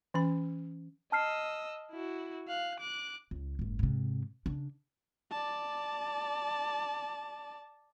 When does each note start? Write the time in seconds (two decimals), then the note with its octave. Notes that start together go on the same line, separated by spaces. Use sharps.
0.14 E3 C#4 B5
1.12 D#5 A5 E6 F6 C7
1.92 E4 F#4
2.48 F5 F#6
2.80 D6 F#6
3.31 C#2
3.59 F#1 G#2
3.79 G#2 C3
4.46 C#3 D4
5.31 D5 A5